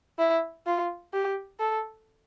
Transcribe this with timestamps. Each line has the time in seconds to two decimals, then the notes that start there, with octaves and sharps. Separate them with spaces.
0.19 E4
0.66 F4
1.13 G4
1.60 A4